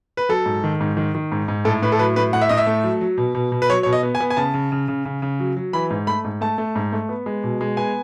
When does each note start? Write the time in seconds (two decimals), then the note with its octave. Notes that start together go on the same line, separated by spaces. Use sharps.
0.17 B4
0.29 F#3 A4
0.46 G#2
0.64 D#3
0.80 G#2
0.97 D#3
1.15 D#3
1.32 G#2
1.48 G#2
1.65 A2 A4
1.82 A2 B4
1.92 A4
1.99 F#3 B4
2.16 A2 B4
2.33 A2 F#5
2.41 E5
2.49 A2 D#5
2.57 E5
2.67 A3
2.84 F#3
3.01 F#3
3.18 B2
3.35 B2
3.52 B2
3.62 B4
3.69 F#3 C#5
3.83 B2 C#5
3.93 D#5
4.03 B3
4.15 G#5
4.20 B3
4.30 G#5
4.37 C#3 A5
4.54 C#3
4.72 C#3
4.88 C#3
5.05 C#3
5.22 C#3
5.40 F#3
5.57 F#3
5.73 E3 B5
5.90 G#2
6.07 A3 B5
6.24 G#2
6.41 A3 A5
6.58 A3
6.75 G#2
6.93 A3
7.09 B3
7.26 G#3
7.44 B2
7.61 G#3
7.77 B3 G#5